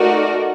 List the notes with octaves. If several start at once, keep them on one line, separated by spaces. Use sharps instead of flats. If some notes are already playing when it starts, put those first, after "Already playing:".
Already playing: A3 D#4 F#4 A#4 D5